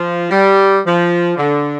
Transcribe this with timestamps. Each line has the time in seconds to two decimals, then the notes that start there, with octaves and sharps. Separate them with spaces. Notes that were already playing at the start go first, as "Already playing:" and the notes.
Already playing: F3
0.31 G3
0.85 F3
1.37 D3